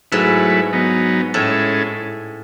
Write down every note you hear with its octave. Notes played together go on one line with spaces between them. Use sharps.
G#2 F#3 A3 E4 B4
F#3 B3 D#4
A2 G#3 C#4 E4 A4